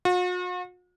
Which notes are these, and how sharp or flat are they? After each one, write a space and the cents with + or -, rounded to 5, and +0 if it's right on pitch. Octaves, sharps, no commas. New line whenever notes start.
F#4 -45